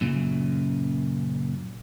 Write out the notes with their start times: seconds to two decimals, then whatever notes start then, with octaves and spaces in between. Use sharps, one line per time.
0.01 F#2 A#2 C#3